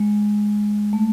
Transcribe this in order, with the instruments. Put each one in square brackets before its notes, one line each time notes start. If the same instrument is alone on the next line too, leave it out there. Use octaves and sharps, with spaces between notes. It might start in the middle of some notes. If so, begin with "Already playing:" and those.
Already playing: [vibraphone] G#3
A3